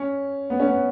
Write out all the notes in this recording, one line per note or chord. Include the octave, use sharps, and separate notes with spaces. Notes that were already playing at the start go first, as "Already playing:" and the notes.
Already playing: C#4
B3
C#4
B3